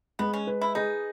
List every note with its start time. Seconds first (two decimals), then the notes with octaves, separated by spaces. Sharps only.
0.19 G#3 B3
0.33 C#4
0.47 B4
0.61 E4
0.75 D#4 G#4